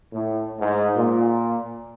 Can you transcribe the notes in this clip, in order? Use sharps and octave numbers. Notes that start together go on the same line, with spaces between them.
A2
G#2
A#2